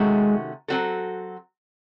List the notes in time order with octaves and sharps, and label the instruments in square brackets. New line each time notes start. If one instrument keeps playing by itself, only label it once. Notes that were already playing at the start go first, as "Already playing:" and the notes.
Already playing: [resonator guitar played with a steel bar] C3 D#3 A3 C#4 F#4 [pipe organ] G#3
[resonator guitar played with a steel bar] F#3 C4 F#4 A4